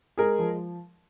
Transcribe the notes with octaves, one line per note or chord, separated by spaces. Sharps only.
G#3 G#4 A#4
F3